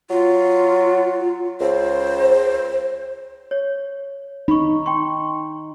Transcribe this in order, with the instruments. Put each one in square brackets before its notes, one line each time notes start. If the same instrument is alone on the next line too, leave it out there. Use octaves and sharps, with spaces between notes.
[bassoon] F#3 [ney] F4
[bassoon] C#2 [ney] C5
[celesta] C#5
[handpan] D#4 [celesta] B5 C#6
[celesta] G5 C6 C#6